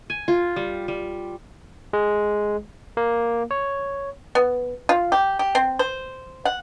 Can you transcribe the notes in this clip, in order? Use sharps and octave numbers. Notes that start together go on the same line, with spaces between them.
G#5
F4
G3
G3
G#3
A#3
C#5
B3
F4
G4
G4
C4
C5
F#5